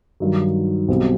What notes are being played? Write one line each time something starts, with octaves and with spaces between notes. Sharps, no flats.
G2 D#3 F#3
B1 B2 G3 C4